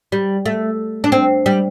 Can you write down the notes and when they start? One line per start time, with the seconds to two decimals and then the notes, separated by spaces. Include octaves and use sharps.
0.12 G3
0.46 A3
1.04 D4
1.12 C4
1.46 G3